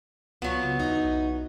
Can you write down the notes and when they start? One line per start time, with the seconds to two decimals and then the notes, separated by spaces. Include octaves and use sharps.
0.42 C#2 F#3 B3 F4
0.63 C#3
0.80 D#2 D#4 E4 D#5
1.04 B1